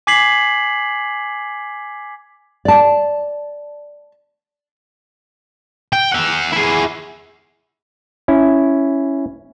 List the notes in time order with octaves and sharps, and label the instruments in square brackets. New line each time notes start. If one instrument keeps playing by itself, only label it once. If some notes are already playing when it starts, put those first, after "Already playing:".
[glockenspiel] G#5 D6 G#6 B6 C7 F#7
[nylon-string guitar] D5 A5
[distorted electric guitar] G5
E5 F#5
E4 G#4
[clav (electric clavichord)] C#4 E4